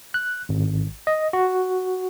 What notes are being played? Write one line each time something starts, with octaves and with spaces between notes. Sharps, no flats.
F#6
G#1
D#5
F#4